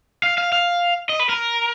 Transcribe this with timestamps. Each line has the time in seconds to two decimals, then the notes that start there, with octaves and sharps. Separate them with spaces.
0.24 F5
0.38 F5
0.53 F5
1.09 D#5
1.19 B4
1.29 A#4